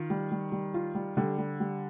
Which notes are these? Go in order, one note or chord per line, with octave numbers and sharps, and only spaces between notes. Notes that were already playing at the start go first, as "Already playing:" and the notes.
Already playing: D#3 F4
G3
G3
G3
F4
G3
D3 G3
G3
G3